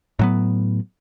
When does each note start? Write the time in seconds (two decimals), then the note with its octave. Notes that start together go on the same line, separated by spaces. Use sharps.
0.19 A2 F#3 B3